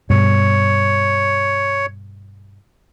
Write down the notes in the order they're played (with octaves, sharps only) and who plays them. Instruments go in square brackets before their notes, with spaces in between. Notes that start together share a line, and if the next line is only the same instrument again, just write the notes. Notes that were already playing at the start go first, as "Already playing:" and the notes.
[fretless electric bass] G2 B2 [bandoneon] C#5